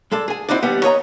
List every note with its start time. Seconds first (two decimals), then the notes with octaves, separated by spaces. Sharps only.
0.12 G#3 A4 D5
0.28 G#4 G#5
0.49 C4 D#4 E4 F#4 D5
0.62 D#2 G3 B3 F#5 G5
0.83 C#5 D#5 A#5